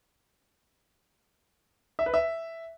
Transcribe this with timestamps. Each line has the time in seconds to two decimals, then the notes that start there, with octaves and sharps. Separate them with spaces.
1.99 E5
2.06 B4
2.14 E5